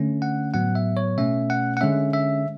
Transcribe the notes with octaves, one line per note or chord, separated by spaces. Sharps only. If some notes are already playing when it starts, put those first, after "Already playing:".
Already playing: D3 A3 C#4
F#5
A2 F#3 B3 F#5
E5
C#5
B2 A3 C#4 E5
F#5
F#5
D3 G#3 C#4 E5
E5